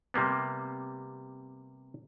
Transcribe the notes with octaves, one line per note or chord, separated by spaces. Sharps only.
C3 G3 A#3 B3